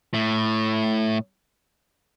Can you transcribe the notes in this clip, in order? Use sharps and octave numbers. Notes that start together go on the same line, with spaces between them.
A2